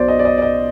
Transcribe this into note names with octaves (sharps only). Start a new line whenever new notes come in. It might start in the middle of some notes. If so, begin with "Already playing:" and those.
Already playing: B1 B2 C5 D5
D#5
D5
D#5
D5
D#5